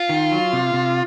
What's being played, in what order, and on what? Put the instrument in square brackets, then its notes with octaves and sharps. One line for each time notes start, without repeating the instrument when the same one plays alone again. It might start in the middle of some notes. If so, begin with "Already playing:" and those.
Already playing: [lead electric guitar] F4
[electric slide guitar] D#3
F#3
C3
C3